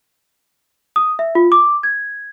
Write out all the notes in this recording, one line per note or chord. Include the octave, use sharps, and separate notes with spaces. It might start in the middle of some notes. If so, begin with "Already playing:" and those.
D#6
E5
F4
D6
G#6